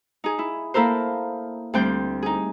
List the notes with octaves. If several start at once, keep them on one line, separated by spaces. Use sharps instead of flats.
D#4 G#4
E4
A#3 E4 A4 A#4 C5
D2 G3 C4 G5 G6
D#4 G#4